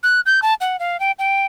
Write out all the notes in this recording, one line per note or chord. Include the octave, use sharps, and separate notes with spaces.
F#6
G6
A5
F#5
F5
G5
G5